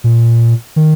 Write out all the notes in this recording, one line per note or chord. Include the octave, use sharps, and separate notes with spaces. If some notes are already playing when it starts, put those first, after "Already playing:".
A#2
D#3